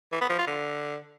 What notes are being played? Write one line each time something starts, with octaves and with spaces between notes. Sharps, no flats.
E3
B3
F3
F4
D3